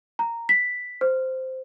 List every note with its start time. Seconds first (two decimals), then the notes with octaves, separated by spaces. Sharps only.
0.19 A#5
0.49 B6
1.01 C5